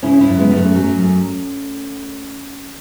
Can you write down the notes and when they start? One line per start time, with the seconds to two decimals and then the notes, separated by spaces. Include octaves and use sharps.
0.03 C#3 C#4 E4
0.21 C#4 E4
0.27 F#2
0.38 G#3 B3
0.51 F#2
0.57 A3 C#4
0.74 F#3 A3 C#4
0.98 F#2